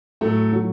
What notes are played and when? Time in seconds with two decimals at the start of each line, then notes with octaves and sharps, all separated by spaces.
0.21 A2 F#3 A3
0.53 F#3